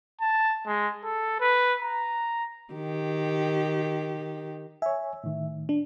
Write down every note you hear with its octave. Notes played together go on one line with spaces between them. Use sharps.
A5
G#3
A4
B4
A#5
D#3 G4
C#5 E5 G#5
A2 D#3
D4